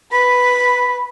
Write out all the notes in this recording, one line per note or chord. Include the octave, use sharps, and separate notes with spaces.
B4 B5 B6